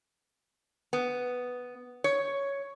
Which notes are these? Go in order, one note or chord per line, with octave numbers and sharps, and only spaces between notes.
B3
C#5